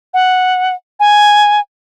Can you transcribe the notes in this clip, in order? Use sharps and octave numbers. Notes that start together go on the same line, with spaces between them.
F#5
G#5